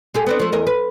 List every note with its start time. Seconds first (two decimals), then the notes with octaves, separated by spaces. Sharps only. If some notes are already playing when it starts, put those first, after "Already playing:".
0.14 G#3 G4 A4
0.27 B3 C4 D4
0.40 F3 A3
0.52 E2 A#4 D#5
0.67 B4